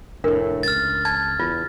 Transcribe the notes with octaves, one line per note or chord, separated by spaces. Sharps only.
F1 A2 D4 A#4
C#2 F6 A6
A5 G#6
E2 F4